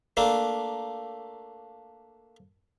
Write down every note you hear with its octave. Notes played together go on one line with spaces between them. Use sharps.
A3 A#3 D4